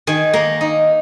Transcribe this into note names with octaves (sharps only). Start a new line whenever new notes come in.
D#3 G#5
A#3
D#4